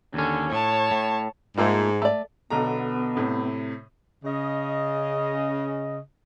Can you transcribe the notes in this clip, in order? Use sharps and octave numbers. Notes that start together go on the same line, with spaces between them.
D#2 D3 C#4
A2 C#5 A5
A2
G#2 A3 A#3 F4
A3 D5
B1 D3 B3 A#5
A2 C3
C#3 D#5